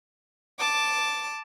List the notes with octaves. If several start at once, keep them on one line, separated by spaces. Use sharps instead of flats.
A5 D6